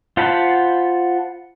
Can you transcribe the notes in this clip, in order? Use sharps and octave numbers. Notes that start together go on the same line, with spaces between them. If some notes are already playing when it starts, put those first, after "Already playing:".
F4 C5 F#5 A5 B5